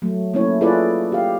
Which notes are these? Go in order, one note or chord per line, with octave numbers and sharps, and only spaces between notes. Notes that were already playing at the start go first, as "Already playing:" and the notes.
F#3 A3
A3 A#3 C#4 E4 C#5
E4 F4 G#4 A4 B4 D5
G4 F5